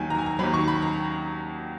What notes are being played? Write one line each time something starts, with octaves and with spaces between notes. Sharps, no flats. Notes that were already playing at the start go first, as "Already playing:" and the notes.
Already playing: D#2 D#3 F#3 G#5
A#5
G#5
A#5
D#2 D#3 F#3 B5
C#6
B5
A#5